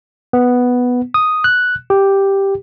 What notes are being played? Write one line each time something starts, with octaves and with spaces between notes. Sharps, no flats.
B3
D#6
F#6
G4